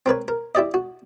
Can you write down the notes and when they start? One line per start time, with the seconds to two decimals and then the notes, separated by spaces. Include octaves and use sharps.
0.06 C4 A#4 B4 C#5
0.28 A#4
0.55 E4 G4 D5 D#5
0.74 F#4